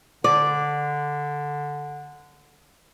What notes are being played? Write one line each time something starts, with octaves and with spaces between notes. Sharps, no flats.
D3 D5